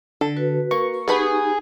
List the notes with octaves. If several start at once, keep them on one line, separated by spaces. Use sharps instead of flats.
D3 A4
F#4 B4
A#3 C#6
B3 D#4 G4 G#4 B4 B5